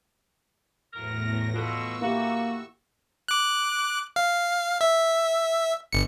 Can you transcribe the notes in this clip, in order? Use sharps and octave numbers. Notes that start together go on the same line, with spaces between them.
E2 A2 F#3 A#4 A#6
B2 F4 A4 C#6 E6
A#3 E4 F#4 G4
D6 F#6
F5
E5
G1 C#7